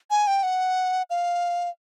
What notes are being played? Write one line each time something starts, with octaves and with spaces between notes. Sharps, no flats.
G#5
G5
F#5
F5